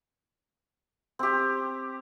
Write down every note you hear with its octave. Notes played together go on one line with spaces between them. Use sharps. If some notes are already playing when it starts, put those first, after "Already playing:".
C4 G4